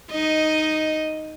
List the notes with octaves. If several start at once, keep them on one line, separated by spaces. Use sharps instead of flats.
D#4 D#5